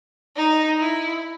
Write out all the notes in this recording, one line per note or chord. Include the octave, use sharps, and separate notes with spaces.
D#4
E4